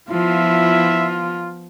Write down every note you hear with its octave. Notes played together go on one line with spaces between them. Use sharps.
F3 B3 E4 F4 E5